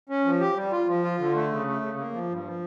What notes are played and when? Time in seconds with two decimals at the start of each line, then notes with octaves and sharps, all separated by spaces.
0.09 C#4
0.25 F3
0.40 G4
0.56 G3
0.72 F4
0.87 F3
1.03 F4
1.19 D3
1.34 A3
1.50 C#3
1.67 A3
1.81 C#3
1.98 A#3
2.13 F3
2.29 G2
2.44 F3